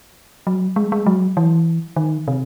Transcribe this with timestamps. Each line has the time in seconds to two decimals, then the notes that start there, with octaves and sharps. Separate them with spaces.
0.47 F#3
0.76 G#3
0.92 G#3
1.06 F#3
1.37 E3
1.96 D#3
2.28 C3